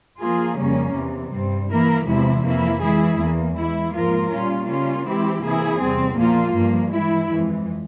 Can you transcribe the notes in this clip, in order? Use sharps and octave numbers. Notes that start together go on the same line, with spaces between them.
F3 A#3 F4 G#4
F2 C#3 G3 A#3 C#4
E2 C3 E3
G2 G3 C4
E3 A#3 E4 A#4
E2 C3 F3 G#3 E4
F2 E3 A#3 E4
E3 G#3 E4 G#4
E2 E3 A#3
E3 G#3 E4
G#2 F3 A#3 F4 A#4
A#2 G3 C#4 F4
C#3 G3 A#3 C#4 F4
E3 G#3 C4 E4 G4
C3 E3 A#3 E4 G#4
E2 C3 G3 C4
A#2 F3 A#3 F4
G2 F3 A#3
E3 G#3 E4
F2 E3 G#3